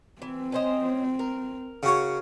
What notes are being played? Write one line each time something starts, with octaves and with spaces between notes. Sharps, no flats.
E3 C4
C#4 C5 D#5
A#4
C#3 F#4 C#5